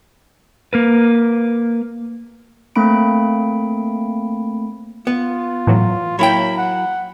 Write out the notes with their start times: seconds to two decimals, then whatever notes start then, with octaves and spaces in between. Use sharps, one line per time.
0.73 A#3 A#4 B4
2.76 A3 A#3 C4 B5 D7
5.07 B3 F4
5.67 A2 E3 F#3
6.19 F#3 A#3 E4 C#5 G5 B5
6.58 F#5